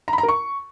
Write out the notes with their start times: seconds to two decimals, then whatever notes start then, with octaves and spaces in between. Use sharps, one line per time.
0.08 A#5
0.13 B5
0.18 A#5
0.23 A#4
0.29 C#6